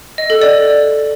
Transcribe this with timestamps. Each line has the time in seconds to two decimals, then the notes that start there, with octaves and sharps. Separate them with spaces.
0.18 D#5
0.30 A4
0.41 D5